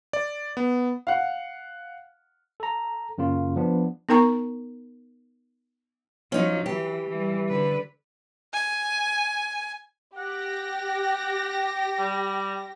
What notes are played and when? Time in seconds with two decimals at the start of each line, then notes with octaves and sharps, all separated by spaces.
0.13 D5
0.57 B3
1.07 F5 F#5
2.60 A4 A#5
3.18 F#2 C#3 A#3 F4
3.56 F3 B3 D4
4.09 B3 D#4 A#4 G5 A#5 C#6
6.32 F3 F#3 C#4 D#4
6.66 E3 G4
7.10 E3 G3
7.49 D3 B4
8.53 G#5
10.17 G4 F#5 A#6
11.99 G3